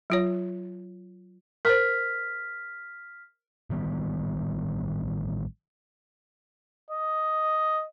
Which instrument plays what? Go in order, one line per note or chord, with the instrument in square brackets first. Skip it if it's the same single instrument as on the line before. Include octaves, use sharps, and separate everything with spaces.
[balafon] F#3 F4 C#5
[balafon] A#4 C5 [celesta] F6 B6
[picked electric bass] A1 D#3 G3 B3
[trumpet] D#5